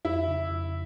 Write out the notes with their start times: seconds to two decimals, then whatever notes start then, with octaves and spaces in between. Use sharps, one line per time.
0.05 F2 E4
0.28 C#3
0.51 F2